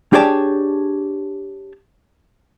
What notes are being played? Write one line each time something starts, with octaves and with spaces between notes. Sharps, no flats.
D4 G4 G#4 C#5 D5 A5